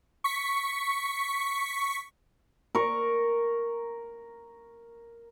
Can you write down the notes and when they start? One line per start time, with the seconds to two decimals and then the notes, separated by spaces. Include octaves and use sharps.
0.24 C#6 B6
2.75 A#4 C#6